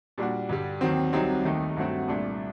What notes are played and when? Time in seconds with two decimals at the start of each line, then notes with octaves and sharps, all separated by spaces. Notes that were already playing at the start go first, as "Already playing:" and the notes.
0.18 A#2 G3 D4 F#4
0.49 G2 D3 G3
0.81 D#2 D#3 F#3 C4
1.13 C2 C3 F#3 C4 D#4
1.45 D#2 D#3 A3 D#4
1.77 G2 F#3 A3 C4 F#4
2.08 C2 A#2 A3 D4